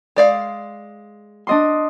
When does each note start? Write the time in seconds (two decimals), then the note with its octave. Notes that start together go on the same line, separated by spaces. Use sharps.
0.16 G#3 D5 F5
1.47 D4 D#5 C6